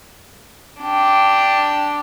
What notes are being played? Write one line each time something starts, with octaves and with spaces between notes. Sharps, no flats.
D4 G4